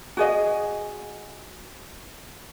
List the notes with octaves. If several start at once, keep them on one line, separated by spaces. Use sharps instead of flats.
F#4 G#4 D#5